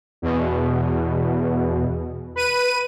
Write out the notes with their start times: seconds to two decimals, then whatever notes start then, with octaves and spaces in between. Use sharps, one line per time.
0.22 E2 B2
2.36 B4 D#7